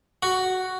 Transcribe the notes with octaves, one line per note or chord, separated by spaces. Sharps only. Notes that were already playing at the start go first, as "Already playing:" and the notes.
F#4